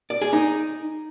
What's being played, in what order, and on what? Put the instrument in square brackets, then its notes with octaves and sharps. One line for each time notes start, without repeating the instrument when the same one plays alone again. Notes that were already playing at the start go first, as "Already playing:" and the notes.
[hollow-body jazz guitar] D5
G#4
D#4